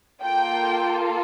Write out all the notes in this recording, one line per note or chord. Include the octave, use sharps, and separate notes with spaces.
A#3 F4 A4 G5